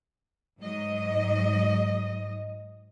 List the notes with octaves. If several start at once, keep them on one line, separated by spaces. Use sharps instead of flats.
G#2 F#3 D#5